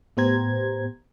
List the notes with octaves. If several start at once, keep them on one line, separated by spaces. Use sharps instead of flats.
A2 B3 G4 C5 A#5 G#6